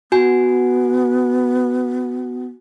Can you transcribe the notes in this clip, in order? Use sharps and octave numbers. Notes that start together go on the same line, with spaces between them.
B3 F#4 G#5